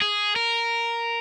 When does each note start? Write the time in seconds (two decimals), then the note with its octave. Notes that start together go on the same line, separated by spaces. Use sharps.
0.02 G#4
0.36 A#4